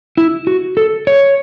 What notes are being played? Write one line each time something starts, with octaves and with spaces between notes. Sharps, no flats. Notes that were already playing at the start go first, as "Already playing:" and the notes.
E4
F#4
A4
C#5